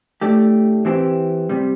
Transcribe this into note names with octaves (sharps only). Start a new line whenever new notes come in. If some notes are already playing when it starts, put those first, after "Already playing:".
A2 A3 D4 G4
E3 C4 E4 G4
C3 G3